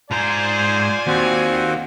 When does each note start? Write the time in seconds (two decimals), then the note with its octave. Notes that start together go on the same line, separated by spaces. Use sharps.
0.11 G#2 F4 C5 D5 G#5 A#5
1.07 D#2 C4 F#4